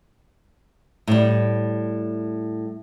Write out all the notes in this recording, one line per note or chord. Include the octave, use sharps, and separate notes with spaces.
A2 G3